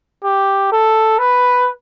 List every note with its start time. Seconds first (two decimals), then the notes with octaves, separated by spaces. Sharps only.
0.23 G4
0.72 A4
1.18 B4